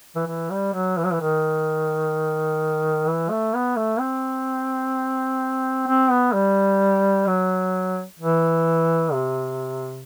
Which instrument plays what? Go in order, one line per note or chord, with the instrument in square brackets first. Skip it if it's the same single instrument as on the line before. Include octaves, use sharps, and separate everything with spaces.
[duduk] E3
E3
G3
F#3
E3
F#3
E3
D#3
E3
A3
B3
A3
C4
C4
B3
G3
F#3
E3
C3